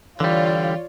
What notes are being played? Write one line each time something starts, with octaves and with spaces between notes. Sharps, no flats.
D3 E3 G3 F4 C#5 D5